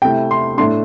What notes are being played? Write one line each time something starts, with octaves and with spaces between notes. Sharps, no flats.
C3 A3 E4 G5
C6
A2 A3 D4 C6